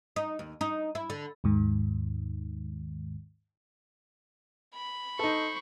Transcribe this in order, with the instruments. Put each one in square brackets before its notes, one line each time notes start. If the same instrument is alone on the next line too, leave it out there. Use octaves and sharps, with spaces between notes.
[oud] D#4
D#2
D#4
E4
D3
[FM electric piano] D#2 G#2 D#3
[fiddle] B5
[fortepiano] D#4 A4 [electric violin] C5 C#6